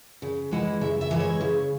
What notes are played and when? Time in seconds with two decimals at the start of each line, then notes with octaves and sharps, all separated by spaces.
0.22 C#3
0.51 E3 G#3 E4 F#5
0.81 C#3 E5
1.01 E5
1.11 E3 G#3 E4
1.20 C#5
1.41 C#3